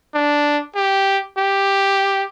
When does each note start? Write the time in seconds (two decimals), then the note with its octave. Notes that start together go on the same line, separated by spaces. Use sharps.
0.15 D4
0.76 G4
1.38 G4